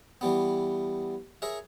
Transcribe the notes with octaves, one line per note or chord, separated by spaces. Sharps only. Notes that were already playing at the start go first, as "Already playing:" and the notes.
E3 G3 B3
G#4 A#4 C#5 E5